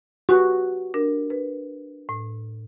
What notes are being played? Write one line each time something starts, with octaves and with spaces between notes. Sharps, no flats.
F#4 G4 B4 F#6
D4 A#4
B4
A2